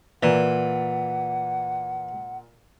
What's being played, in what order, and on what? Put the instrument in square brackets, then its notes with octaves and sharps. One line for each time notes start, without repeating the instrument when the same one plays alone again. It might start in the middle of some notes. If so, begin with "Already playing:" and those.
[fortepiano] A#2 D5 A#5 [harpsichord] E3 [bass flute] F#5